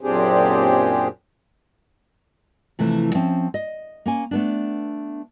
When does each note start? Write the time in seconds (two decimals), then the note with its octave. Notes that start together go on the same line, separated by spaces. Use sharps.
0.01 F#2 A#2 C4 D4 G4 G#4
2.79 C3 E3 F3 A3
3.14 F3 C4 C#4 E5
3.54 D#5
4.06 A#3 C#4 G#5
4.31 A3 B3 D4